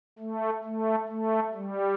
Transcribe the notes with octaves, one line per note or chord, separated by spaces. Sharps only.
A3
A3
A3
G3